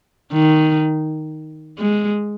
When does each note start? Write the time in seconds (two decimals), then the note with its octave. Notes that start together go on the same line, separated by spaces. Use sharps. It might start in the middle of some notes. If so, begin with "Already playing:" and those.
0.32 D#3
1.79 G#3